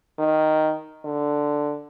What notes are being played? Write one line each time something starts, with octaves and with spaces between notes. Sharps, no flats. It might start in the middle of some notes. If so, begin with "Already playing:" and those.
D#3
D3